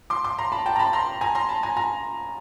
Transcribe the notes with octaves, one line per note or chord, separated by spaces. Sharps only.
C6 D6
C6 D6
A#5 C6
A5 B5
G5 A5
A#5
A5 B5
A#5 C6
G#5 A#5
A#5 C6
A5 B5
G#5 A#5
G#5 A#5